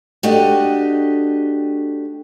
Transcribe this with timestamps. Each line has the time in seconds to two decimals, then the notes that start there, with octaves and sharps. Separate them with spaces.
0.23 A3 D4 F#4 G4 D#5